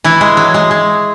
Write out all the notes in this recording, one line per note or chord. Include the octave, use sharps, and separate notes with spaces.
E3 E4
G#3
F#3
G#3
G#3